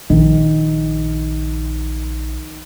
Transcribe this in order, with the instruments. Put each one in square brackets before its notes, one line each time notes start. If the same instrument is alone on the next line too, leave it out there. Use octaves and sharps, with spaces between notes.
[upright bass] A#1 [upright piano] D#3